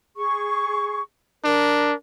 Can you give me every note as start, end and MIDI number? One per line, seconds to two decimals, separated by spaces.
0.16 1.01 68
0.16 1.01 85
1.44 1.93 62
1.44 1.95 70